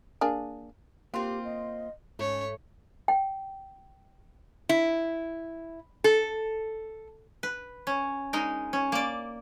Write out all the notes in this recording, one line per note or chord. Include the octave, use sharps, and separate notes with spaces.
A#3 D4 G#4
A#3 C4 F4 G4
D#5
G#2 A3 C#4 C#5
G5
E4
A4
B4
C#4
G#3 D#4 A#4
C#4
A#3 D5